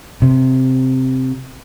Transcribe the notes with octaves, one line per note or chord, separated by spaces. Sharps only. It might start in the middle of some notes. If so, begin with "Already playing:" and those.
C3